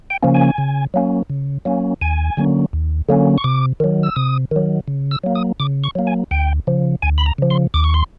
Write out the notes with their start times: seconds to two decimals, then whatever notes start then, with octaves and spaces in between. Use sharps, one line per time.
0.10 G5
0.23 C#3 F3 A#3 C#4
0.34 G#5
0.58 C#3
0.94 F#3 A#3 C#4
1.30 C#3
1.65 F#3 A#3 C#4
2.01 D#2 G#5
2.37 D3 F#3 A#3 C#4
2.73 D#2
3.09 D3 F#3 A#3 C#4
3.38 C#6
3.44 C3 D6
3.80 D#3 F#3
4.03 E6
4.16 C3 D#6
4.51 D#3 F#3
4.88 C#3
5.11 E6
5.24 F#3 A#3
5.36 D#6
5.60 C#3 D6
5.84 C#6
5.95 F#3 A#3
6.07 G#5
6.31 D2 G5
6.67 C#3 F3
7.02 D2 G#5
7.18 B5
7.26 A#5
7.38 C#3 F3
7.50 C6
7.74 D#2 D6
7.84 C#6
7.94 C6